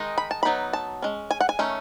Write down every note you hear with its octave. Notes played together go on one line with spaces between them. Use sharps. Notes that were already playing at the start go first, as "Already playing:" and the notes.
Already playing: D#3 G#3 D#4
B5
A5
F#3 B3 D#4 B5
A5
G#3 C#4
G#5
F#5
G#5
D#3 A3 C#4